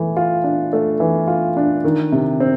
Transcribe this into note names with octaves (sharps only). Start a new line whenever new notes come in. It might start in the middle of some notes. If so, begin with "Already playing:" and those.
Already playing: E3 A3
F4
D4
A3
E3
F4
D4
D#3
C3
C4